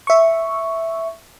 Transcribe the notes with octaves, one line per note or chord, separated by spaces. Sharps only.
E5 C#6